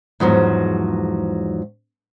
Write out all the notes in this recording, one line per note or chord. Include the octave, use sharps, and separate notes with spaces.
E2 G#2 F3 F#3